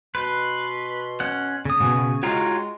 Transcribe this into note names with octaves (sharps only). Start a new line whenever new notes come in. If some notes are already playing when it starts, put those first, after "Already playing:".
B2 B4 C6
C#4 F#5
C#3 D#6
G#2 B2 F#4 G#5
G#3 F4 F#4 C#5 G5 A#5